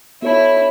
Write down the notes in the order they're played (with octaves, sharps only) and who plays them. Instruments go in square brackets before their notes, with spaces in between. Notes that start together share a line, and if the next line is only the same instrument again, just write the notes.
[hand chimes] B3 F#4 A4 C#5 A5 [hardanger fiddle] E4